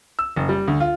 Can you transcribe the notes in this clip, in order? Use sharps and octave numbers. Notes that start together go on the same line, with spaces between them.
E6
F#1
G3
D2
F4